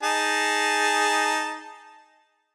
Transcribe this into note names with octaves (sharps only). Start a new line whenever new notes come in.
D#4 G#4 A5